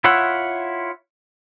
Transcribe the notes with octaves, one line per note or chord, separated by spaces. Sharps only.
E4 F4 C#5 E5 F#5